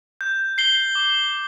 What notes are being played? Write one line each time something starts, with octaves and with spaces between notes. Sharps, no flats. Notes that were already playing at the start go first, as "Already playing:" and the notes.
G6
C7 G7
D6